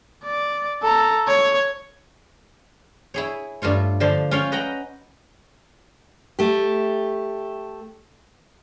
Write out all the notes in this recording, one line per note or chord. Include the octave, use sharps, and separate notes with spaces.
D5
A4 A#5
C#5
E4 G#4 C#5
G2 A3 F4 C#5
D3 F3 D4 C5 F5
C#4 F4 C#5 F5 G5
B4 D#5 F#5 G5 A#5
A3 G4